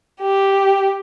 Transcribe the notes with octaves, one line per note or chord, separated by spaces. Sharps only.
G4